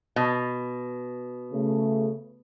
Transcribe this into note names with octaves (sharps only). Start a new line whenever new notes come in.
B2
C#3 A3